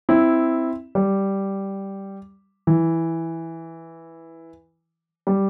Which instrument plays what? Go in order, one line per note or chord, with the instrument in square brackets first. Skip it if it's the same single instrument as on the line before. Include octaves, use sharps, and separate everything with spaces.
[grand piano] C4 E4
G3
E3
G3